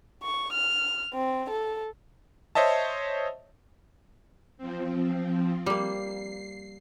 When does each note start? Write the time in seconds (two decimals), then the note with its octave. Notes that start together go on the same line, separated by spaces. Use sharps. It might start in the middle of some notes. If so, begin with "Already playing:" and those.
0.23 C#6
0.53 F6
1.14 C4
1.50 A4
2.55 C5 C#5 D#5 E5 A5
4.58 F3 C4
5.66 G3 A#3 C7